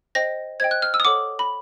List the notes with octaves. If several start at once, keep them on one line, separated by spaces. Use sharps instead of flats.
C5 D#5 G5 A#6
C5 D#5 G5 G#6
F#6
F6
E6
D#6
A4 C#5 F#5 D6
B5